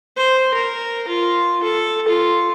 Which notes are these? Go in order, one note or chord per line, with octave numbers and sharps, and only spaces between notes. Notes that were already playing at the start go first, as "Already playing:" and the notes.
C5
A#4
F4
A4
F4